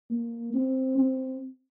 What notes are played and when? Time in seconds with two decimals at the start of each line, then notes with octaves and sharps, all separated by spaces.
0.10 A#3
0.54 C4
0.98 C4